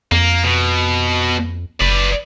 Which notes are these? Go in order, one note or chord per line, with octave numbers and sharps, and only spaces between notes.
F2 A#3
B2
F#1 B4 D5